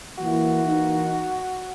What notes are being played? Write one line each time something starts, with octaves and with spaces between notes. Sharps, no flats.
E3 A#3 E4 F#4
E3 A#3 D#4